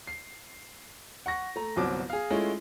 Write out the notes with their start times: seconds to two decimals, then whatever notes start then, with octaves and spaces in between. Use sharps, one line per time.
0.07 C7
1.26 F#5 C#6 A#6
1.56 A3 A#5
1.76 G1 C2 F#3 C4 D6
2.10 G#4 F5
2.30 G#3 A3 C#4 E4 F4